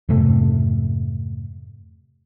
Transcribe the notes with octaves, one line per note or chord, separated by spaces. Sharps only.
F2 G#2 C3 A3